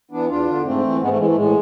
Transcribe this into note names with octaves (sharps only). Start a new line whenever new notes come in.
E3 B3 D4
E2 D4 F4
D3
G#2 A3 C4
E3
G#2 G#3 B3
A3
E3 G#3
A3
A2 G#3